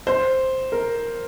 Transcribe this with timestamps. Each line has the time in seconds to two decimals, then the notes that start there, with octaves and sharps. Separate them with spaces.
0.07 C5
0.72 A#4